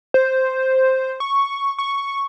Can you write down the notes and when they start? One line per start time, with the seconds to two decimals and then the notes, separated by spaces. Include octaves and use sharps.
0.14 C5
1.20 C#6
1.79 C#6